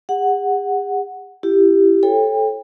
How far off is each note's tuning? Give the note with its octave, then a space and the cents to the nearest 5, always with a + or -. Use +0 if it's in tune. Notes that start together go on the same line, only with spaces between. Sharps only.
G#4 -45 F#5 +0
E4 +20 G4 +0
A4 -15 C#5 -30 G5 +30